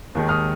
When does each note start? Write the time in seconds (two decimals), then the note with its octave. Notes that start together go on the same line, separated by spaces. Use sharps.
0.15 D#2 D#3 G#3
0.29 D#6 F6